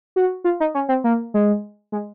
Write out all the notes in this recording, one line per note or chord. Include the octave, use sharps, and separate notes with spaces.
F#4
F4
D#4
C#4
C4
A#3
G#3
G#3